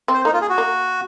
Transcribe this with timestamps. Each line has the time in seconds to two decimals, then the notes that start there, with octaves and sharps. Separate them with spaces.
0.08 C4
0.14 C5
0.25 A#3 D#4
0.33 F4
0.41 G#4
0.49 F#4
0.58 A#3